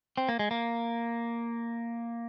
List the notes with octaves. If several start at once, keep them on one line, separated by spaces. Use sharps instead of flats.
C4
A#3
G#3
A#3